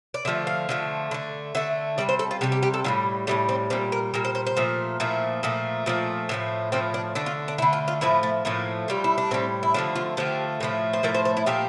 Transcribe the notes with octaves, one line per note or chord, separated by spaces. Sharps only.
D5
D3 F3 A3 E5
F5
D3 F3 A3
D3 A3
D3 A3 E5
C3 G3 D5
C5
A4
F4
C3 G3 G4
G4
G4
A4
A2 E3 G3 F4
A2 E3 G3 A3
C4
A#2 G3 C4
A#4
A#2 G3 A#4
C5
C5
C5
A#2 F3 A3
A#2 F3 A3 E4
A#2 F3 A3
A#2 F3 A3
A2 F3 A3
A2 F3 A3 C4
D4
D3 A3 D4
F4
D4
D3 A3 E4
F4
F4
A2 F3 A3 E4
A3
A2 F3 A3 A#3
A2 G3 F4
E4
D4
A2 G3 C4
E4
D3 F3 A3 D4
F4
D3 F3 A3 G4
A2 F3 A3
C5
A2 F3 A3 A#4
C5
C5
E4
A#2 F3 A3 G4